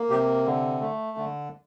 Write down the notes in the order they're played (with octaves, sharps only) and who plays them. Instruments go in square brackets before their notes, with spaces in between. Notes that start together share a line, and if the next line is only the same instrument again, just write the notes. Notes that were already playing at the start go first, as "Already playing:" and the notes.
Already playing: [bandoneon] A#3
C3 G4
D3
A3
D3